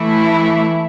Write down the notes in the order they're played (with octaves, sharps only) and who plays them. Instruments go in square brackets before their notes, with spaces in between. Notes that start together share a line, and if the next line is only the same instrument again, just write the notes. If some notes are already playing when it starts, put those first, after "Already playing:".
Already playing: [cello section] E3 A3 E4